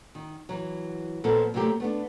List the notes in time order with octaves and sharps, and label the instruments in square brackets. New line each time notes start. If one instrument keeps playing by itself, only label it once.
[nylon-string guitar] D#3
E3 F#3
A#2 F3 B3 A4
C3 F#3 A3 A#3 G4
A3 B3 D4